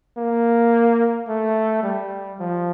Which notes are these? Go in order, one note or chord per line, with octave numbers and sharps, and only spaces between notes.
A#3
A3
G3
F3